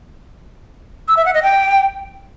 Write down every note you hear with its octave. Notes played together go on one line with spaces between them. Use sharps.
E6
E5
F#5
D#5
G5